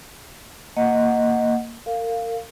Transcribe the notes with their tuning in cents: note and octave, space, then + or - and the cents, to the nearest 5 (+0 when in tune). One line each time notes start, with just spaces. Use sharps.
A#3 -10 D#5 +0 F#5 +0
A#4 -35 F5 +0